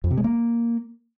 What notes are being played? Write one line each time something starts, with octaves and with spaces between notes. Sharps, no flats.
F2
C3
G#3
A#3